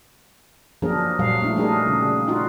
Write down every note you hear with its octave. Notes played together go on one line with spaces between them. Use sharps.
F3 F#3 A#3 D4 G#4 A#4
A#2 F#3 G3 F5
A3 D4 E4
F#3 G3 D4 D#4 G#4 A#4
C#3
D#4 F4 F#4